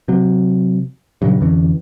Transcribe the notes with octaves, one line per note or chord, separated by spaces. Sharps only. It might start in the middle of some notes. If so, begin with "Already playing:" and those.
C3 F#3
G2 A#2 C#3 F#3
F2 D3 E3 C#4